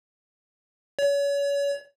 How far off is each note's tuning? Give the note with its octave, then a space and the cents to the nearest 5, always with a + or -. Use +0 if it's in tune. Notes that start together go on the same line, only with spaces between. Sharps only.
C#5 +35